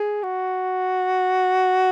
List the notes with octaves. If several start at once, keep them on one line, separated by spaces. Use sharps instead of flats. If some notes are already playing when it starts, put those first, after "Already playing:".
Already playing: G#4
F#4